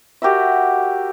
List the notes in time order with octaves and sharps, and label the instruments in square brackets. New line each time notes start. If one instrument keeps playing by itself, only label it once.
[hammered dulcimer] F#4 G4 A#4 E5